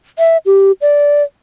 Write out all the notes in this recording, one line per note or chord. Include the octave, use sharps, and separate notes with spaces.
E5
G4
D5